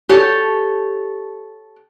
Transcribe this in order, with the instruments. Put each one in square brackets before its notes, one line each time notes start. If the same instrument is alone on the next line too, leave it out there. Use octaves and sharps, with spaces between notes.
[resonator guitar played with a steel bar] G4 A4 C#5